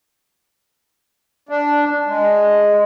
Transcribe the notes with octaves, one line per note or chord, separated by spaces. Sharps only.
D4
G#3